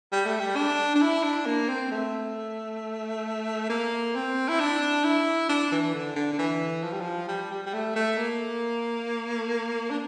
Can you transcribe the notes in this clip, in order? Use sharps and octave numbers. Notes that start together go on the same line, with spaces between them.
G3
A3
G3
D4
D4
E4
D4
A#3
C4
A3
A#3
C4
E4
D4
E4
D4
E3
D3
D3
D3
E3
F3
G3
F3
G3
G3
G3
A3
A3
A#3
D4